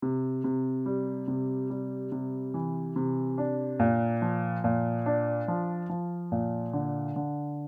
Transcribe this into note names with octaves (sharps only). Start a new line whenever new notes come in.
C3
C3
G3
C3
G3
C3
E3
C3
D4
A#2
F3
A#2
D4
F3
F3
A#2
D3
D3